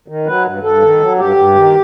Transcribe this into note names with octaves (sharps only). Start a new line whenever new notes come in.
D#3
F#3 B4
G2
G2 A4
D#3
F#3
G2 G4
G2
D#3